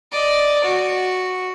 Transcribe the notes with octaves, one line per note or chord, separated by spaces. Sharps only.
D5 D#5
F#4